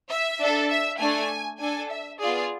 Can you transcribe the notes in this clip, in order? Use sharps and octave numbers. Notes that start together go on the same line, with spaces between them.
E5
D4 A4
E5
A3 D4 A4 G#5
D4 A4 G#5
E5
B3 F4 G#4 D5